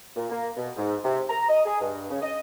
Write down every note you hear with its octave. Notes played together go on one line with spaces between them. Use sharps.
A#2
A#3
B2
G#2
C3
A#5
D#5
G#4
G2
C#3
D#5